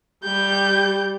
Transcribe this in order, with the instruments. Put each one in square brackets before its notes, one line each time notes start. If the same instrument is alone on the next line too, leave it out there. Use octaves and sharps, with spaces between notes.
[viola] G3 G4 [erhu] G6